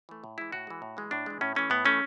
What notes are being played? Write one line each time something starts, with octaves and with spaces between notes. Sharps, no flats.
E3 A3
A2
E3 G#3 E4
A2 F#4
E3 G#3
A2
E3 G#3
A2 D4
E3 G#3
A2 C#4
E3 A3 C#4
A2 B3
E3 A3 C#4